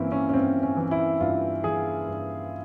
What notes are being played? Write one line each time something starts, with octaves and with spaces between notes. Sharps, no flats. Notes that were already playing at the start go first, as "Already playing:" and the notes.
Already playing: G2 E3 A#3 C4 C#4 E4
C#4
C#4
G2 C4
C#4
E3
E4
G2 F4
E3 G#4
G2